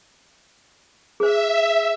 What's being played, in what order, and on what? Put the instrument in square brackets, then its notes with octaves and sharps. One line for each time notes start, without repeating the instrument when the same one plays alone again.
[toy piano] G#4 C5 [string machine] E5